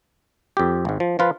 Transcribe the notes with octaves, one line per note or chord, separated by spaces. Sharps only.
F2 G4
G#1 G#2
F3
F3 F4 B4